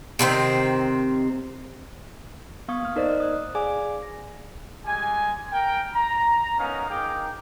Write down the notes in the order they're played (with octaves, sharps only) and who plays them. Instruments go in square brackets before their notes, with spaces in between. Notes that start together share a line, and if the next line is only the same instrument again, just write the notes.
[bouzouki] C3 D#3 B3 C4
[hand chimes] B3 F5 C#6 D#6 G#6
A#3 F6
D#4 A#4 C5 D5 D#5
D#6 F#6
G#4 D5 F5 G#5 D6
A#6
[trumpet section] G3 G#3 G#5
A#4 G5
A#5
B3 C#4 D#4 A#4 F5
D#4 G#4 A#4 G5 D6